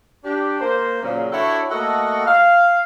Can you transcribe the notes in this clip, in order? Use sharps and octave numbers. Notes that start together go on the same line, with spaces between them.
D4 G4
A#3 C5
A#2 C#3 F#3
D4 E4 F#4 A4 C#5 G5
A3 A#3 F#4 A4 D#5 F#5
F5